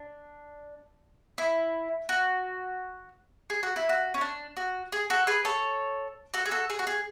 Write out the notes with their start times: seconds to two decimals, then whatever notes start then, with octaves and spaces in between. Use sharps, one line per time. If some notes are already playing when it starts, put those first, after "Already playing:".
Already playing: D4
1.38 E4
2.09 F#4
3.50 G#4
3.63 F#4
3.76 E4
3.89 F#4
4.14 C#4
4.21 D4
4.57 F#4
4.92 G#4
5.10 F#4 A4
5.27 G#4 B4
5.45 A4 C#5
6.34 F#4 A4
6.46 G#4
6.51 F#4 A4
6.70 G#4
6.79 F#4
6.87 G#4